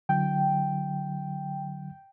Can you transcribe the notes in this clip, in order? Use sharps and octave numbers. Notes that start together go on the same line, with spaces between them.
D3 F#3 G5